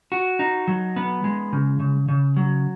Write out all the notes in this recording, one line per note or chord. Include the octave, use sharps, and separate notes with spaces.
F#4
D#4
F#3
B3
G#3
C#3
C#3
C#3
F#3